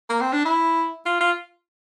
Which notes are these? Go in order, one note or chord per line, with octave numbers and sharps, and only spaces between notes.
A#3
C4
D4
E4
F4
F4